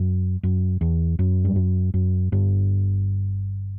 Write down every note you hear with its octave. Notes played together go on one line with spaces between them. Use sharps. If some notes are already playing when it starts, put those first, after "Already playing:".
Already playing: F#2
F#2
E2
F#2
G2
F#2
F#2
G1 G2